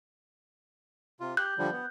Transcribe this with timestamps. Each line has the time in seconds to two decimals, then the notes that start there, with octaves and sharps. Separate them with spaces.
1.20 C3 F4
1.37 G4 F#6 G6
1.58 D3 F3 G3
1.72 B3